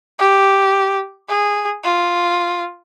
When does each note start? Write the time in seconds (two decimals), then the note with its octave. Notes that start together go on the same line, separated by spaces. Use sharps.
0.19 G4
1.29 G#4
1.84 F4